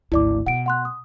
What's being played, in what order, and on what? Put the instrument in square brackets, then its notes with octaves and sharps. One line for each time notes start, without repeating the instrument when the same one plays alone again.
[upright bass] G#1 D2 [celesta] E4 D5 D6
[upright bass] B2 [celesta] F#5 D7
[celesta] F#5 C6 F#6
D#6